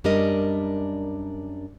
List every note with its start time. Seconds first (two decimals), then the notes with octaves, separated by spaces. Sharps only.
0.04 F#2 G3 D4 A#4 D#5